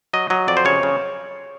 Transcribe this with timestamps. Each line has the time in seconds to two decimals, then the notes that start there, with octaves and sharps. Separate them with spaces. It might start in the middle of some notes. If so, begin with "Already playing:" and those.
0.13 F#3 D#5
0.30 F#3 D#5
0.48 F2 D5
0.57 C5
0.65 C#3 C#5
0.83 C#3